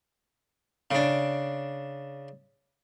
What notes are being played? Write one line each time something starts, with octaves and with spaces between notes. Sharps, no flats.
C#3 D4